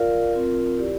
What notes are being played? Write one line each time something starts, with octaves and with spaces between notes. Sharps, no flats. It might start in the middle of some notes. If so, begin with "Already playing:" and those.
Already playing: F4 A#4 D5 F5
C4 F4 A#4
E4 G4 D5